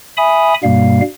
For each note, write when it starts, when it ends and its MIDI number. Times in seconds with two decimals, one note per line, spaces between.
0.17 0.54 76
0.17 0.54 80
0.17 0.54 83
0.17 0.54 87
0.64 1.01 43
0.64 1.01 47
0.64 1.01 55
0.64 1.01 58
0.64 1.01 77